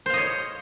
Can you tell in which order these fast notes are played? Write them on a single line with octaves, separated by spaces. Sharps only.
C5 F5 D#5 C#5